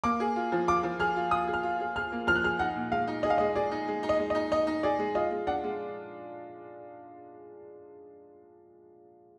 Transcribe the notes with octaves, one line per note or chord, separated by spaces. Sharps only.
A#3 D6
G#4
F4
F3
F4 D6
F3
G#4 F6
F4
F4 D#6
G#4
F6
F4
G#4
G#4 F6
A#3
F3 F6
F#6
G#4 F6
D#4 F#5
A#2
G#3 F5
D#4
G#4 D#5
F5
G#3 D#5
G#4 D5
D#4
G#3
D#4
D#5
G#3
D#5
D#4
D#4 D#5
D#4
G#4 D5
G#3
F4 D#5
G#3
D4 F#5
G#3